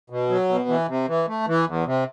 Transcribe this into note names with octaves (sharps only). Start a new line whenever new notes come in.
B2
F#3
B2
E3
C3
E3
A3
E3
E2
C3